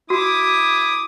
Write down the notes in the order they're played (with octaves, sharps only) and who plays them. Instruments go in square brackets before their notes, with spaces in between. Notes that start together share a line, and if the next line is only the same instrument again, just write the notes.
[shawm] E4 [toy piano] F#4 [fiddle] D6 D#6